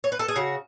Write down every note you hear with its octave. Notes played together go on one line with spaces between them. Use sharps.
C#5
B4
A4
G#4
C#3 F#4